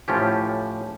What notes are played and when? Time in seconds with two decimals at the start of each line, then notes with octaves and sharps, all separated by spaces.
0.08 A2 F3 C#4 G4